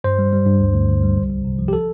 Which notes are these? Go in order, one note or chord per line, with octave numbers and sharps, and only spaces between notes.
G2 C5
G3
G3
G2
D2
D2
D3
G3
C2
C2
C3
F3
G4
A4